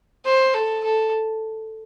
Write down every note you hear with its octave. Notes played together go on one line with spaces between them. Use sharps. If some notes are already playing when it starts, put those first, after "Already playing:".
C5
A4
A4